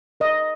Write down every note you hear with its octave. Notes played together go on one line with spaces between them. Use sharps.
A#4 D#5